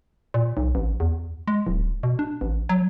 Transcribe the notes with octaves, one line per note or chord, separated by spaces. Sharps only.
A#2
B1
A1
E2
G#3
D1
B2
D4
A1
F#3